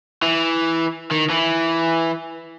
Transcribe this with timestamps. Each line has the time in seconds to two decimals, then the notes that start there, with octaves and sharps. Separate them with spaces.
0.23 E3
1.12 D#3
1.30 E3